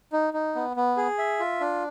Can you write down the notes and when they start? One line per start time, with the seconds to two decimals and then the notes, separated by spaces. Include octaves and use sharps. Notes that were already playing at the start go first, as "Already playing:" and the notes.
0.13 D#4
0.34 D#4
0.55 B3
0.77 B3
0.97 G#4
1.18 E5
1.40 F4
1.60 D4